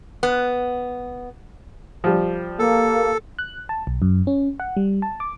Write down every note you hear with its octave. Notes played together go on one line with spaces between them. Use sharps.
B3
F3 G3
A#3 A4
F#6
A5
B1
F#2
C#4
F#5
G3
A5
D6